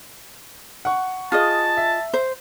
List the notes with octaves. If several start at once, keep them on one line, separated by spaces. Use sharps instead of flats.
F#5 C#6
F4 G#4 D#5 A5
E5
C5